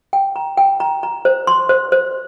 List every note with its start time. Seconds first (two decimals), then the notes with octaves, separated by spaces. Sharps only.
0.13 G5
0.36 A#5
0.57 G5
0.80 A#5
1.03 A#5
1.25 C5
1.47 C6
1.69 C5
1.92 C5